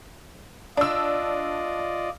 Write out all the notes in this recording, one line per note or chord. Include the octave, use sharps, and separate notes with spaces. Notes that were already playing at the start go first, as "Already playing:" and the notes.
D4 F4 D5 D#5 E6